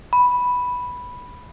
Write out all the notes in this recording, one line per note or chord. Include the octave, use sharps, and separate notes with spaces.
B5